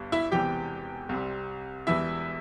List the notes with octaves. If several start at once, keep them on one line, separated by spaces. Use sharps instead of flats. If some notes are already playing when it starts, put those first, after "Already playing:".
Already playing: G1 G2 G3
E4 E5
E1 E2 C3 E3 G3 G4 G5
C2 C3 G3
E1 E2 E3 G3 E4 E5